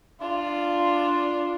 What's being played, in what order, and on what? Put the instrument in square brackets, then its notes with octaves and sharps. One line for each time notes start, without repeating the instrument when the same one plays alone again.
[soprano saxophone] D4 [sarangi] F4 [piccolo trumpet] C6